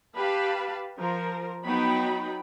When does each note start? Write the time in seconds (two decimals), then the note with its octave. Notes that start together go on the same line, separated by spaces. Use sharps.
0.16 G4 B4 F5 A5 B5
0.98 F3 A#4
1.64 F#3 B3 D#4 G5 B5